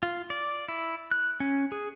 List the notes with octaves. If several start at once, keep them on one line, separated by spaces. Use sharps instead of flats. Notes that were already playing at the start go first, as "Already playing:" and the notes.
F4
D5
E4
F#6
C#4
G#4